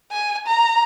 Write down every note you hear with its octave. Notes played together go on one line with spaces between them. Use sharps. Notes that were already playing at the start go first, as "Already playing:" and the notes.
G#5
A#5